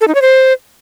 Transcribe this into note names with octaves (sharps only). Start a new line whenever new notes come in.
A4
D#4
C#5
C5